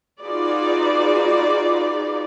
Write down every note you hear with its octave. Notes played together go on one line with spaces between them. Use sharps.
D#4 F4 F#4 G#4 B4 D5